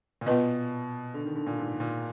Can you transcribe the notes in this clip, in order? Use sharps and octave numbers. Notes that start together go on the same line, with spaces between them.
A#2
B2 B3 F4 B4 D#5
D3
D#3
D3
A#2
G#2
A#2